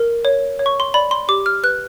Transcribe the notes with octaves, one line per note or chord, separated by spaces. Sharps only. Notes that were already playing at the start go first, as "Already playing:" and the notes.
Already playing: A#4
C#5
C#5
C#6
C6
D5 B5
C6
G4 D6
F6
B4 F#6